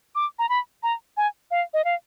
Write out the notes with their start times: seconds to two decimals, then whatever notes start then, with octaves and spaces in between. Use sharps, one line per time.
0.15 D6
0.39 A#5
0.49 B5
0.83 A#5
1.17 G#5
1.51 F5
1.74 D#5
1.85 F5